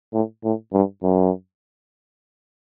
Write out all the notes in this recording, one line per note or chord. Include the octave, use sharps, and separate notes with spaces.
A2
A2
G2
F#2